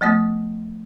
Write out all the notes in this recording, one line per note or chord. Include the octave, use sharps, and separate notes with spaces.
F3 A3 B3 D#6